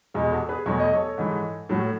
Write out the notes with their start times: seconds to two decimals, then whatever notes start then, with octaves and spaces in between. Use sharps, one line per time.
0.14 E2 B2 G#3
0.31 F#4 A4
0.49 G#4 B4
0.66 E2 B2 F#3 A3 C#5
0.80 D#5
0.93 A4 C#5
1.18 G#2 E3 G#3
1.69 A2 F#3 A3